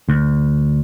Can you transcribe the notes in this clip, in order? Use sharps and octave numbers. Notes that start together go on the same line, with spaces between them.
D2